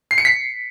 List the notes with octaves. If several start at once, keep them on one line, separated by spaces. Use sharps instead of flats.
C7
C#7
B6